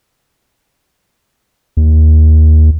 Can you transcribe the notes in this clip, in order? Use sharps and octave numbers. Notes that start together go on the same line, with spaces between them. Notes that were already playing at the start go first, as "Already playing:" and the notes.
D#2